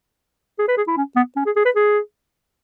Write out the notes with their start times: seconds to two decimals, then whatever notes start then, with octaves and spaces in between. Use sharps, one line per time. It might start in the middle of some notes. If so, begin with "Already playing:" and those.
0.59 G#4
0.68 B4
0.77 G#4
0.87 E4
0.97 C#4
1.16 B3
1.36 C#4
1.46 G#4
1.56 G#4
1.65 B4
1.75 G#4